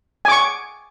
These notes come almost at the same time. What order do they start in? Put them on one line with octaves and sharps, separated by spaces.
G#5 D6 C#6